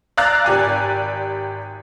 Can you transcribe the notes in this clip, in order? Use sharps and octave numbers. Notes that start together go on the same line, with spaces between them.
D5 F5 A#5 E6 F#6 A6
G#1 G4 D5 G#5